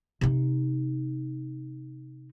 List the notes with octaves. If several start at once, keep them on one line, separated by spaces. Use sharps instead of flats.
C3 D#4